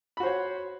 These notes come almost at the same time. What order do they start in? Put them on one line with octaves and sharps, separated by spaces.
B5 F#4 C5 C#5